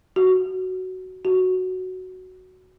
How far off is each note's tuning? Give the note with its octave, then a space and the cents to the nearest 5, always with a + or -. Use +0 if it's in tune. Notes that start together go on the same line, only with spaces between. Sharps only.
F#4 +10
F#4 +5